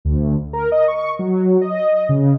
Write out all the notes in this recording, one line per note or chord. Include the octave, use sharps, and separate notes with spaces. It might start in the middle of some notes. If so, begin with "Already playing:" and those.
D2
A#4
D#5
C#6
F#3
D#5
C#3